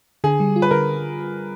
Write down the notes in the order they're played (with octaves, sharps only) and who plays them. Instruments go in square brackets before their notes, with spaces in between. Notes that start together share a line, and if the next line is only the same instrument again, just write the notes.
[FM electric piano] D3 [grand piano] G#4
[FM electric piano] G3
F4
[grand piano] B4
[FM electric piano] D3 [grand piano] A#4